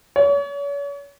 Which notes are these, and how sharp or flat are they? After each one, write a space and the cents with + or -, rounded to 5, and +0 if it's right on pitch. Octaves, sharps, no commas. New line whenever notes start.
C#5 +40